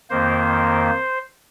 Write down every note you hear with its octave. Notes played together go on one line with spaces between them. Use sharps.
F2 D#3 A#3 C5